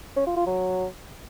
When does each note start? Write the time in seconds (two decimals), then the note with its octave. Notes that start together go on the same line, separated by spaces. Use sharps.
0.16 C#4
0.26 F4
0.36 F4
0.47 F#3